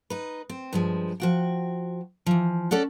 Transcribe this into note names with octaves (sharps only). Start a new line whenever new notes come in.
D#4 B4
C4
G2 F3 G#3
F3 F#4 G5
E3 F3
C#4 A4 D5 F#5